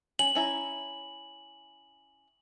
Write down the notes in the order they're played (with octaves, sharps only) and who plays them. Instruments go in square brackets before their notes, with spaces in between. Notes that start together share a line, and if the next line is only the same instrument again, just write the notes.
[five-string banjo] C#4 [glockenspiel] F#7
[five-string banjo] C#4 E4 A#5